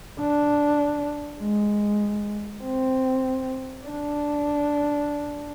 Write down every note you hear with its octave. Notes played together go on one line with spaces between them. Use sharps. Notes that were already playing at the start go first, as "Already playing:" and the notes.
D4
G#3
C4
D4